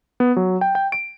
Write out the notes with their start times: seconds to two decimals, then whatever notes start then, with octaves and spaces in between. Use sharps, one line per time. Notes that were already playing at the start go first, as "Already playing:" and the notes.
0.20 B3
0.36 F#3
0.61 G5
0.75 G5
0.92 D7